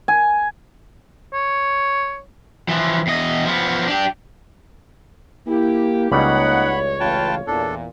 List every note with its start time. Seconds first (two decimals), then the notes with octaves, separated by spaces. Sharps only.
0.08 G#5
1.33 C#5
2.68 E3 F3
3.07 E2 D#5
3.45 F3 B3
3.87 D4 G4
5.47 A#3 E4 G4
6.12 C#2 C#3 G3 A#3 D#4 C#5 F#5 B5
7.00 A1 F4 B4 G5 A5
7.47 E2 A#2 D4 A4